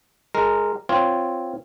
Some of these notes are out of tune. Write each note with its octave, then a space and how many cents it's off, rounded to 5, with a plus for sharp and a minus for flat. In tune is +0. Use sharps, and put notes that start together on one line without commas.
G#3 +5 A#4 -10
C4 +0 F4 +0 C#5 +0